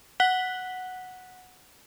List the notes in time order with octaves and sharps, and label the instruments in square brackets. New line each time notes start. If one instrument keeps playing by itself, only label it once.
[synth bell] F#5 F#6 B6 F#7 G7